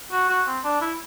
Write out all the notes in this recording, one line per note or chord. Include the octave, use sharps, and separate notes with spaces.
F#4
F#4
C4
D4
E4